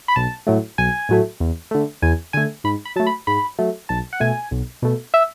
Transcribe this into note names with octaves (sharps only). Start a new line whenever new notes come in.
B5
B1 A5
A2 F#3 A3
B1 G#5
A2 F#3 A3
E2
D3 A3
E2 G#5
D3 A3 G#5
G#2 B5
B5
F#3 A3 A5
B5
G#2 B5
F#3 A3
B1 A5
F#5
B2 A3 G#5
B1
B2 A3
E5